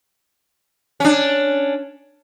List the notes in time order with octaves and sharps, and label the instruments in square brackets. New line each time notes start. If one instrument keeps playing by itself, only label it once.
[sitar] C#4 D4